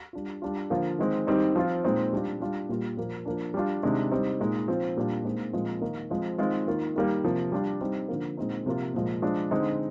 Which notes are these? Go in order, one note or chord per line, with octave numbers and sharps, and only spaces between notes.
G3 D4 F4
G3 D4 F4
D3 F3 A#3 F4
D#3 G#3 C4
D#3 G3 C4 D#4
F3 C4 F4
A#2 G#3 C4 D#4
G3 D4 F4
G3 D4 F4
A#2 G3 A#3 F4
A#2 F3 A#3
F3 A#3 D4
G3 D4 F4
C3 D#3 G#3 D4
G3 C4 D#4
A#2 G#3 D#4
F3 C4 F4
A#2 G3 D4 F4
A#2 G#3 C4 D#4
A#2 F3 G#3 C4
D#3 A#3 D#4
F3 G#3 C4 F4
D#3 G#3 C4 F4
D#3 A#3 F4
D#3 G3 A#3
C3 F3 A#3
G3 D4 F4
G3 C4 D#4
D3 F3 A#3
A#2 G#3 C4 D#4
C3 F3 A#3 F4
A#2 F3 G#3
F3 G#3 D4
D3 G#3 C4 D#4